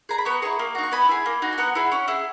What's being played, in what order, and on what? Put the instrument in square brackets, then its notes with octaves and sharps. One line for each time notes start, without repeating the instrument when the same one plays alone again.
[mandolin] G#4 A#5
B5
B3 A#5 C#6
E4 G#4 A#5 C#6
A#3
D#4 F#4
C#6
B3 G#5 B5
E4 G#4
A#3
D#4 F#4
G#5
B3 F#5 A#5
E4 G#4
C#4
E4 G#4